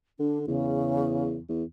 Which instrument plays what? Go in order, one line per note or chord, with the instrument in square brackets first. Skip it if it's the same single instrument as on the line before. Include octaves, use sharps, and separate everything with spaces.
[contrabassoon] D3 [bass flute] D4
[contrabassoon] E2 [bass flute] C#3
[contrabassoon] E2